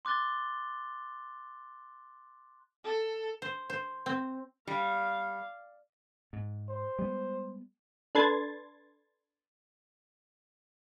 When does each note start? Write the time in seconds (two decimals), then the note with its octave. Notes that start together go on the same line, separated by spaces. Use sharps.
0.05 C6 D6 F#6 A6 G7
2.84 A4
3.42 C5
3.70 C5
4.06 C4
4.67 G3 F5
6.33 G#2
6.69 C5
6.99 G3 G#3 B3
8.15 D4 A4 B4 C6 G#6 A6